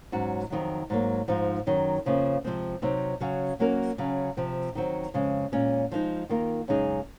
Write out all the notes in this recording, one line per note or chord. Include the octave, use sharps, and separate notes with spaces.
G#2 F#3 C#4 F#4
F2 D#3 F#3
G#2 F#3 A#3
G#2 F3 G#3 D#4
F#2 D#3 F#3
F2 C#3 F3 A#3
C3 F3 G#3 C4
C3 F#3 C4 D#4
C#3 F#3 C#4 F#4
F#3 A#3 C#4 F#4 A#4
C#3 F#3 C#4
C3 F3 C4
D#3 F#3 C4 F#4
F2 C#3 G#3
A#2 G#3 C#4
F3 G#3 C4 D#4
D#3 A#3 F4 A#4
F#2 C#3 G#3 D#4 G#4